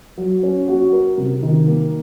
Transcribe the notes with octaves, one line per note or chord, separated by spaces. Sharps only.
F#3
C#4
F#4
A#4
C3
D#3
A#3